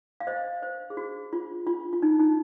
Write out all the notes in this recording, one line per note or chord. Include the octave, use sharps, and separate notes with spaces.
F5
C5 D#5
C5
G#4
F#4
F4
F4
F4
D#4
D#4